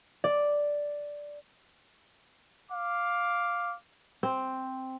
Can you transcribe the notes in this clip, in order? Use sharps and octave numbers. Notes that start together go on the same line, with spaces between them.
D5
F5 D6
C4